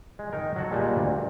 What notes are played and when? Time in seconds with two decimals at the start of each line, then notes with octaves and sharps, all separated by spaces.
0.19 G#3
0.33 D#3 D#4 A#4
0.56 F#3 F#4 A4
0.71 A#2 G3 G#3
0.97 D2
1.17 G2